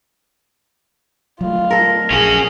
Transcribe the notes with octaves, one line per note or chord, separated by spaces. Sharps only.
F#3 A3 F4
A4 A#4
A#1 C#4 F#4 G#4